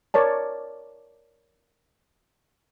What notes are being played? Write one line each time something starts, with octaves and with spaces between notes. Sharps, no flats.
A#4 C#5 D5 A5